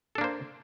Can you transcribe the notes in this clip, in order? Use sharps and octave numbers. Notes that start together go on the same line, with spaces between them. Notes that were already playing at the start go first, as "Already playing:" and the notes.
A#3 D4 A4 C5